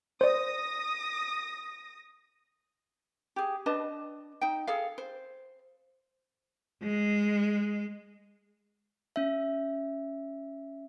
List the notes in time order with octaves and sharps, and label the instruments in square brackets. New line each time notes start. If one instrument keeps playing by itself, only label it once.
[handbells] C5 D5 [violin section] D#6 A#6
[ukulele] G4 G#4
D4 B4 D#5 A5
D#4 G5
G#4 A4 F5
C5
[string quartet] G#3
[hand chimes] C#4 E5